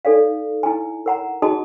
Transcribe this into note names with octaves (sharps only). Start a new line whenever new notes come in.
D#4 A4 D5 F5
E4 G#5
A#4 F#5 A#5
D#4 F#4 G#4 D#5 A5 D#6